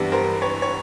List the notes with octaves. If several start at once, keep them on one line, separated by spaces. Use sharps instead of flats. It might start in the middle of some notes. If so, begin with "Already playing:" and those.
Already playing: G2 E3 G3 B3 D4
A#4 C5
B4 C#5
C#5